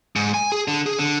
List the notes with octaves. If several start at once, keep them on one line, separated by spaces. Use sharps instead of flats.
G#2
G#5
G#4
D3
G#4
D3